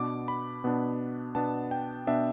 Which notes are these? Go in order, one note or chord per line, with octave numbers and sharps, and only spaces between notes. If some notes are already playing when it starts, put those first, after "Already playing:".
Already playing: B2 B3 D4 D6
B5
B2 B3 D4
B2 B3 D4 A5
G5
B2 B3 D4 E5